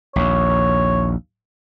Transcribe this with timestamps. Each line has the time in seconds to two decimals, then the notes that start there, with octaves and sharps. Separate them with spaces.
0.16 A#1 D#2 C#5